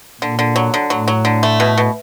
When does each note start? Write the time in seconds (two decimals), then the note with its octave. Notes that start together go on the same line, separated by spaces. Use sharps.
0.21 A#2 D3
0.39 D3
0.56 F#3
0.74 D3
0.90 A2 F#3
1.08 F#3
1.25 D3
1.43 A3
1.60 B2
1.78 B2